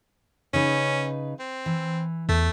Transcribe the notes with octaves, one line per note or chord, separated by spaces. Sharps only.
C#3 C#4 D#4 B4
C4
E3
E2 A3